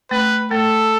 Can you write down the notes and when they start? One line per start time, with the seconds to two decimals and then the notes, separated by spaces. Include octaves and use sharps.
0.11 A3 B4
0.51 A3 A4